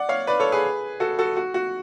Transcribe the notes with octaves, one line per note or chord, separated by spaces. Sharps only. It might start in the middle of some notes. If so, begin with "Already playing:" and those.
Already playing: D5 F#5
C#5 F5
B4 D5
A4 C#5
G#4 B4
F#4 A4
F#4 A4
F#4
F#4